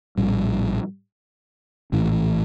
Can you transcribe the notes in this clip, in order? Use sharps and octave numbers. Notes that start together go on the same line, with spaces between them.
A#1 A2 G3
A#1 A2 E3